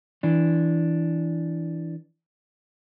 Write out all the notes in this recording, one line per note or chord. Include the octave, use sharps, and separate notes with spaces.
E3 D4